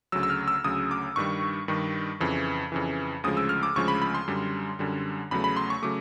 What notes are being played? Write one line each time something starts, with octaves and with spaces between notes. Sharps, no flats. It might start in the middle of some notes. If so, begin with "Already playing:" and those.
D2 C#3 F#3 E6
E6
F6
E6
D2 C#3 F#3 D#6
D6
G2 D#3 G3 C#6
G2 D#3 G3
F2 C#3 E3
F2 C#3 E3
D2 C#3 F3 G#3 D#6
E6
F6
D6
D2 C#3 F3 G#3 C#6
B5
B5
C6
F#2 D3 G3
F#2 D3 G3
E2 C#3 F#3 A3 B5
B5
C6
C#6
C#3 F#3 A3 D6